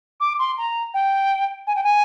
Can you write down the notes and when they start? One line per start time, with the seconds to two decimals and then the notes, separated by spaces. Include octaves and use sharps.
0.20 D6
0.39 C6
0.57 A#5
0.94 G5
1.67 G#5
1.75 G5
1.83 G#5